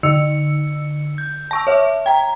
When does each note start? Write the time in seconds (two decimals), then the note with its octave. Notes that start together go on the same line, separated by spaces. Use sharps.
0.03 D3 E6 C#7
1.18 G6
1.51 A5 C#6 E6
1.67 C#5 E5
2.06 G5 A#5